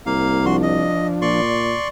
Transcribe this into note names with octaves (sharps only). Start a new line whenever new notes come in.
C2 A#3 F5
F3 D4 F#4 C6
D#5
A#2 D5 C6 C#6